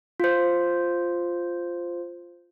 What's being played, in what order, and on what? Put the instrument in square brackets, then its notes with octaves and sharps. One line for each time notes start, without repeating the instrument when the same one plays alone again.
[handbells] F4 C5